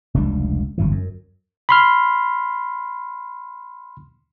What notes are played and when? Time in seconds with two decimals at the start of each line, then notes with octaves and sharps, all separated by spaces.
0.14 F1 C#2 G3 D4
0.78 G1 F#2 E3
0.91 F#2
1.69 B5 C6 F6